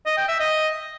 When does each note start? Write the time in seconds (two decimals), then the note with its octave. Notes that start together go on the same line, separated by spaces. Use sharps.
0.06 D#5
0.17 G5
0.29 E5
0.40 D#5